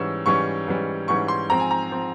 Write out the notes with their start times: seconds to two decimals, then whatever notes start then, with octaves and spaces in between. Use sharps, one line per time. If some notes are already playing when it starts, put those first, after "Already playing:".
Already playing: G#2 E3 G3 C#4 E6
0.26 G#2 E3 G3 C#4 C#6
0.67 G#2 E3 G3 C#4
1.08 G#2 E3 G3 C#4 C#6
1.28 C6
1.49 G#2 F3 C4 A#5
1.60 G#5
1.71 A#5
1.91 F3 C4